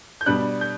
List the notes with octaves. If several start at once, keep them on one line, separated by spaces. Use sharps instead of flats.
G6
B2 G3 B3 D4 F#6
G6